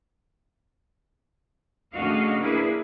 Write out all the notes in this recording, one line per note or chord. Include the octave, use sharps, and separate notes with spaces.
C#3 A3 D4 F#4 D#5 F5
A#3 D4 E4 G#4 B4